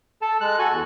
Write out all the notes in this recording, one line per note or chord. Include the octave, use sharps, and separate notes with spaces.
A4 A5
G#3 F#6
F#4 A4 G#5
E2